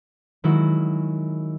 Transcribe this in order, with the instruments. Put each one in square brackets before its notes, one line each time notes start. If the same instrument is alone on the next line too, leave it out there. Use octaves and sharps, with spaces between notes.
[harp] D#3 F#3 G#3 E4 F#4